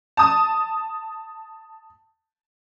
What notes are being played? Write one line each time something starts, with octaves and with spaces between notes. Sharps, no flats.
A5 D#6